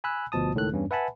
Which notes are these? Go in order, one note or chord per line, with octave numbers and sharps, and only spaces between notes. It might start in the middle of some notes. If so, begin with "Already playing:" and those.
G#5 B5 E6 F#6
G1 D2 B2 F3 A5 D#6
C#2 A2 D#3 A4 F#6
E2 G2 C#4
B4 E5 F#5 G#5 A5 B5